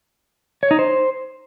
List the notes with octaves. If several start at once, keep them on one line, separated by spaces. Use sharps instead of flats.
C#5
D#4
C5